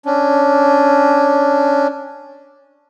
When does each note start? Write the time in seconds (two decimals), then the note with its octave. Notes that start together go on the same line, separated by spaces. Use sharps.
0.06 C#4 D4